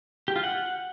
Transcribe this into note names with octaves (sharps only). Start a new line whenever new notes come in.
G4
F4
F#5